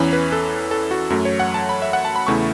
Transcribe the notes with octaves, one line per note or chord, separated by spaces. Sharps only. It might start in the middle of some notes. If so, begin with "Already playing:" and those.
Already playing: E2 E3 C#4 B5
B4
A4
A4
F#4
F#2 F#3 A3
C#5
F#5
A5
B5
E5
F#5
A5
B5
E2 C#3 A3 E4 C#6